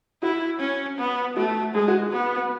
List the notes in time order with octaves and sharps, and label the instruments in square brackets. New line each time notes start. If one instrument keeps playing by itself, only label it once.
[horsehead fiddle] E4 [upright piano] F#4
[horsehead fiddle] C#4
B3
[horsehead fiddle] A3 [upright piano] F#4
[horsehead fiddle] G#3 [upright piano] G#4
[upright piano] F#4
[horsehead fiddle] B3